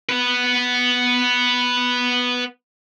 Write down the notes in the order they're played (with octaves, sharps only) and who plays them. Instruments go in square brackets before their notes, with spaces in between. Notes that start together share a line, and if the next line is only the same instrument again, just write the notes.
[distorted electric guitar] B3 B4